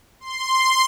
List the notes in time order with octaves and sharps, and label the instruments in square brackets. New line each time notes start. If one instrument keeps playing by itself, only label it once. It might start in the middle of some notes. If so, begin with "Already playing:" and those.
[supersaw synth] C6